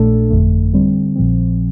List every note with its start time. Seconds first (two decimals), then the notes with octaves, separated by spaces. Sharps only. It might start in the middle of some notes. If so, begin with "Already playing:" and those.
Already playing: A#1 A#2 A3 D4 A4
0.30 G1 F2 D3 A3
0.73 D3 G3 C4
1.16 A#1 A#2 F3 C4